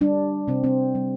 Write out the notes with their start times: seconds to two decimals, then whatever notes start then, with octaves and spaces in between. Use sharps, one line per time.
0.01 G3 D4
0.48 C3 C4
0.64 C4
0.95 G3